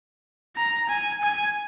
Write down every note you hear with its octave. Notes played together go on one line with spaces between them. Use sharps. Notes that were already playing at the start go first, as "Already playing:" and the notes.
A#5
G#5
G#5